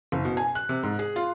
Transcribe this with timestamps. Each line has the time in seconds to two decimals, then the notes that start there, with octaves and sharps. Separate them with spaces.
0.12 F#1
0.25 B2
0.37 G#5
0.55 F#6
0.69 C3
0.83 G#2
0.99 G#4
1.16 F4